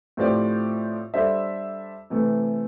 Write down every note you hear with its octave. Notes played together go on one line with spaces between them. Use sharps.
A2 F3 C4 G4 D5
G3 D4 A4 C5 E5
C3 E3 A3